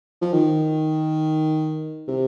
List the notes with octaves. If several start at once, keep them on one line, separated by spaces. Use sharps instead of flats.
F3
D#3
C3